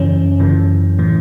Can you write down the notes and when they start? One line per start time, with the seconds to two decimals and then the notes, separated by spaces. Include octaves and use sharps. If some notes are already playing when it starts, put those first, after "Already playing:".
Already playing: F#2 C#3 E3 C#4
0.39 F#2 C#3 E3
0.98 A2 E3